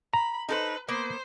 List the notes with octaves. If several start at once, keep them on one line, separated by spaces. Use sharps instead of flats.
A#5 B5
D#4 A4 B4 C5
A#3 B3 C5